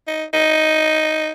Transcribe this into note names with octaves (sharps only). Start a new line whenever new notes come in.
D#4
D#4